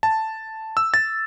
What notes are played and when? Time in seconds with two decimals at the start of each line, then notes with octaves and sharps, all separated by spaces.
0.03 A5
0.77 E6
0.94 A6